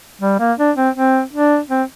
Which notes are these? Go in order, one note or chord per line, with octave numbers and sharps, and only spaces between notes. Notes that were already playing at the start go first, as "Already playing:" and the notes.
G3
A#3
D4
C4
C4
D4
C4